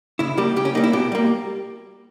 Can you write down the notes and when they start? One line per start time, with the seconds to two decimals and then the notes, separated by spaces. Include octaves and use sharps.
0.19 C#3 E4
0.37 G3 A#3 G4
0.56 C#3 G4
0.65 C#4
0.75 G3 A#3 D#4
0.84 E4
0.93 B2 G4
1.12 G3 A#3